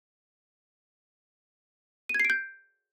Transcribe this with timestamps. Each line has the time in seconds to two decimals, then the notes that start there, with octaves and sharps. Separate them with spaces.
2.09 D#7
2.14 G#6
2.20 C7
2.25 D7
2.30 G6